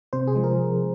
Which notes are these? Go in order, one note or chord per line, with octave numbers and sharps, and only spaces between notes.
C3 C5
G#4
F3 G#3
A#4